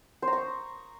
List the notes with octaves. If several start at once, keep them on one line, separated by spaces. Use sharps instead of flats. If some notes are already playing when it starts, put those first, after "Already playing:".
C5
A#5
C#6
D#6